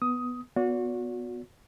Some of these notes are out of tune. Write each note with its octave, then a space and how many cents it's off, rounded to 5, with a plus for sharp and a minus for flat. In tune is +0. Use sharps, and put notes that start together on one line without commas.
B3 +0 D#6 +10
B3 +0 F#4 -30 D5 -40